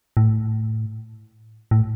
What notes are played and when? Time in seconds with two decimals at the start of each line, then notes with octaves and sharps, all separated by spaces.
0.17 A2
1.71 A2